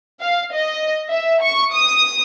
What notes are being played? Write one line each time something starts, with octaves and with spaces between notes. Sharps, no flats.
F5
D#5
E5
C#6
D#6